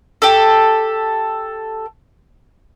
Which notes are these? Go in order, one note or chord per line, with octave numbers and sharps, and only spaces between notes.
G4 A4